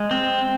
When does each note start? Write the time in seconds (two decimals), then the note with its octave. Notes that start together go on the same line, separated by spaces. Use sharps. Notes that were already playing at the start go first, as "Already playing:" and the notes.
Already playing: G#3
0.11 C4